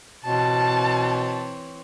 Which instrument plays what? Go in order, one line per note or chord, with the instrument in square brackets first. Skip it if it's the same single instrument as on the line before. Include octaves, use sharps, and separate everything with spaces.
[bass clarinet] B2 [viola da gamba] E3 C4 C#5 [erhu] A5